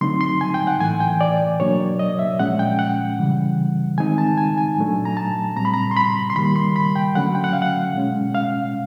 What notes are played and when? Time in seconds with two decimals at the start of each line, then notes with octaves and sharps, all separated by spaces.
0.01 D3 F#3 A3 C4 D#4 C6
0.21 C6
0.41 G#5
0.54 G5
0.67 F#5
0.80 A2 E3 A3 G#5
1.00 G5
1.21 D5
1.60 B2 F#3 A#3 D4 C#5
1.80 D5
1.99 D#5
2.19 E5
2.39 A#2 F3 G#3 C#4 F#5
2.59 G5
2.79 F#5
3.18 C#3 E3 G3
3.98 D#3 G#3 C4 D#4 G#5
4.18 A5
4.38 G#5
4.58 G#5
4.77 A#2 F#3 A3 D4
5.05 A#5
5.17 A5
5.56 A#2 G3 C4 A#5
5.65 B5
5.74 A#5
5.91 C6
5.97 B5
6.30 C6
6.36 D#3 G3 A#3 B5
6.56 C6
6.76 B5
6.96 G5
7.15 D3 F#3 A3 C#4 F#5
7.35 G5
7.44 F#5
7.53 F5
7.62 F#5
7.95 B2 G#3 C#4
8.34 F5